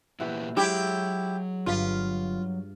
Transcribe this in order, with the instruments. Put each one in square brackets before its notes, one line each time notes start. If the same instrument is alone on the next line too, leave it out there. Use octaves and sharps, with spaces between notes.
[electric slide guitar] A#2 E3 B3 [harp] E4 F#4 G4
[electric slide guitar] F#3 [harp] G#3 [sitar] E4 G4
[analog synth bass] G1 [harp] G2 B6 [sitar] F4